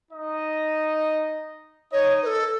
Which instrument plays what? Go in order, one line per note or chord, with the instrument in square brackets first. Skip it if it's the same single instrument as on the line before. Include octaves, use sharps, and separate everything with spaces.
[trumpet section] D#4 D#5
[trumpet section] D#4 D#5 [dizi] C#5
[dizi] B4
A4